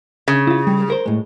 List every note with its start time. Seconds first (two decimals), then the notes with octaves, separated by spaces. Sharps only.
0.28 C#3
0.47 E4 F4
0.67 G3
0.90 A#4 C5
1.06 A2 G#3